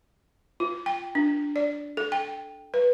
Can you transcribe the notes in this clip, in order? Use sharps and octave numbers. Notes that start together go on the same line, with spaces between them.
F4
G5
D4
D5
A4
G5
B4